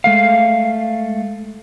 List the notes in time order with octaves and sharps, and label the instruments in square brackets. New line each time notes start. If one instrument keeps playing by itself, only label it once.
[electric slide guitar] G#3 A3 F5